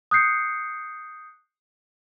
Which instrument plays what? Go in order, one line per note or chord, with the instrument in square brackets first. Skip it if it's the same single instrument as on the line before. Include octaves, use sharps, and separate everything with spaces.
[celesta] D#6 F#6 G6 C7 C#7